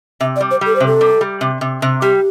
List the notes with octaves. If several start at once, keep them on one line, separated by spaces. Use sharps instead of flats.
C3 E5
D5
G3
C5
G3 A4
C3 C5
A4
G3
G3
C3
C3
C3
G3 G4